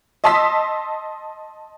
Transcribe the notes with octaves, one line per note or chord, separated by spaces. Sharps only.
D#5 A5 C6 D#6 E6 B6